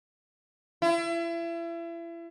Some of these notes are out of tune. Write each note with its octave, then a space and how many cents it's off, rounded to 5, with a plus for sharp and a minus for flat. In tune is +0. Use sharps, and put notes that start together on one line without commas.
E4 +35